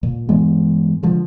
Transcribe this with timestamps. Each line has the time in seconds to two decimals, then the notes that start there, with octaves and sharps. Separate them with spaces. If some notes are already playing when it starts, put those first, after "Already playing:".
0.03 A#2
0.29 G2 E3 G#3 B3
1.03 D3 F3 G#3